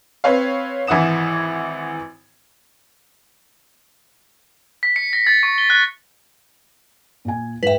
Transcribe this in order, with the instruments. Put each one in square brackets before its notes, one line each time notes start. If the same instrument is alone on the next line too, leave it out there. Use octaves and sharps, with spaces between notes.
[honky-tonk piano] C4 B4 C#5 F5
G#1 E3 E4 F#5 D#6 E7
[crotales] B6
C#7
A#6
A6
C#6
G7
F#6
[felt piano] A#2 G#5
[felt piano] G#2 G5 [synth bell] B4 E5